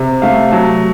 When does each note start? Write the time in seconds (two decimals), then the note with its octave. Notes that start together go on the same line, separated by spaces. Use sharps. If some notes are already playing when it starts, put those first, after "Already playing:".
Already playing: C3
0.22 A3 F5
0.52 F#3 A5